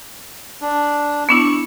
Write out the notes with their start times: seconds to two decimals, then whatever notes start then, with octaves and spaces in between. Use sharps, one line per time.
0.62 D4
1.29 B3 D4 E4 C#6